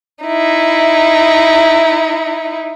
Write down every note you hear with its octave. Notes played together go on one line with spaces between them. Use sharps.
D#4 E4